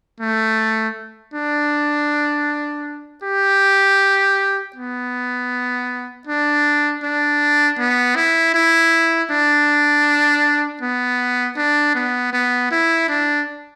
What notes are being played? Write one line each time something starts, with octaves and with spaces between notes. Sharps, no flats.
A3
D4
G4
B3
D4
D4
B3
E4
E4
D4
B3
D4
B3
B3
E4
D4